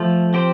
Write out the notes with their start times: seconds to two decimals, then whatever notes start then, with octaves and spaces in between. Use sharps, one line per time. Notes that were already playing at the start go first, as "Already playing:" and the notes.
Already playing: F3 A3
0.34 C4 G4 C5